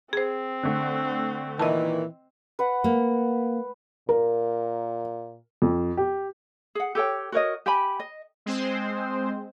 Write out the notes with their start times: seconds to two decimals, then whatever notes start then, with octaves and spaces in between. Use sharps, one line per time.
0.13 C4 G#4 C5
0.63 D3 A3
1.59 A#2 D#3 E3 D#5 A5
2.59 B4 F#5
2.84 A#3
4.09 A#2 A#4
5.62 F2
5.97 G4
6.75 G#4 F#5
6.95 G4 A4 C#5 G5
7.32 F#4 A#4 C#5 D#5
7.66 G4 G5 G#5 B5
8.00 D#5
8.46 G#3 C4 C5